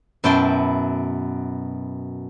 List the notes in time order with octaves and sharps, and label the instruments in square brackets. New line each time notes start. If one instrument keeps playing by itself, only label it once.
[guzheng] F#2 B2 E4 G5 A5 C6